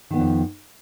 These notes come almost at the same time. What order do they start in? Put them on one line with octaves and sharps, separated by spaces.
D#3 B3 F3 F2